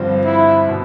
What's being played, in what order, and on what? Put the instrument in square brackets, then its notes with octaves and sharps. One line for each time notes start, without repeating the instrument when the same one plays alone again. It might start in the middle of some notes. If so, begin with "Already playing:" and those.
Already playing: [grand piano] G2 D3 F3 C4
[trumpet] E4
[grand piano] B2